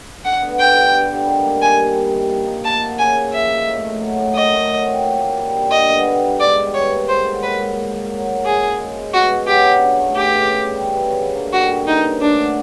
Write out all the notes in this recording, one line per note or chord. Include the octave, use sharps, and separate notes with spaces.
D3 F#5
B3
G3 G5
D3
G2
G3
D#3
A#3
C3 G#5
G3
D#3
C3
F3
D#4
A#3 A5
F#4
C#3 G#5
A#3
F3 E5
D#4
A2
A3
F#3
A2
D#3 D#5
A3
F#3
C4
A#2
A#3
G3
D4
D3 D#5
B3
G3
D#4
G#2 D5
G3
E3 C#5
A#3
G#2 C5
F#3
D#3 B4
G#2
A#2
A#3
F#3
A#2
F3 G#4
C#4
G#3
E4
B2 F#4
B3
F#3 G4
D4
C#3
A3
E3 G4
C#3
C#3
G3
E3
C#3
D3
A#3
G3 F#4
D3
E3 D#4
C#4
A3 D4
F#4